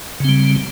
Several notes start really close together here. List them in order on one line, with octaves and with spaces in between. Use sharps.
C#3 C4 G3